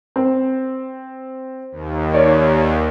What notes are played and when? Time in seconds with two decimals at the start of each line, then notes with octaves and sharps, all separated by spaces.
0.16 C4
1.72 D#2
2.14 C#5 D5